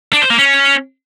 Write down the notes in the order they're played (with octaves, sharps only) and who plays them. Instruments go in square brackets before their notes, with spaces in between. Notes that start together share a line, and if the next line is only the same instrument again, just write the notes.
[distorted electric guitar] D4
C5
A#3
C#4